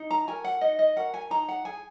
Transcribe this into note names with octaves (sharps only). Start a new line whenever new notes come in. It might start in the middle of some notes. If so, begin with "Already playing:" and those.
Already playing: D#4
A#5
F#4 A#4 G#5
F#5
D#4 D#5
D#5
F#4 A#4 F#5
G#5
D#4 A#5
F#5
G#4 G#5